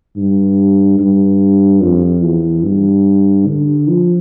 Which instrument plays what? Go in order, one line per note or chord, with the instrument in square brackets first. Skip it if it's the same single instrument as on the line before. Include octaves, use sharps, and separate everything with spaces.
[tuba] G2
G2
F2
E2
G2
D3
F3